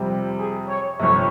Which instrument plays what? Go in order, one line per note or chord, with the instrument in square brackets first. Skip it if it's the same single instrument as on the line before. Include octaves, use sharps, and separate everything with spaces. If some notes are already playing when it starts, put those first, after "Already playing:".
Already playing: [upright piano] F2 C3 G3 C4 G4
[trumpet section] G#4
C#5
[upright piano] G1 F2 C3 [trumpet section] C#5